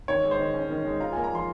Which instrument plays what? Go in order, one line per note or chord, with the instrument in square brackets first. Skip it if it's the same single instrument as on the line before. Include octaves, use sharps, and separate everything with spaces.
[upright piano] D#3 [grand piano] C#5
[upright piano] G#3
[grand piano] C5
[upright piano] D#3
C#4
D#3
G#3
[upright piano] F4 [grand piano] A#5
[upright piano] A#3 [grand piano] G#5
[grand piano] A#5
[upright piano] F3 [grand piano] C6